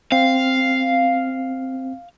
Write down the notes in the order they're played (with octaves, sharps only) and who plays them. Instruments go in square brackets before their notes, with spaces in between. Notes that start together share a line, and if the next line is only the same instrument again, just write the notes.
[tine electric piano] C4 [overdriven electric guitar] F5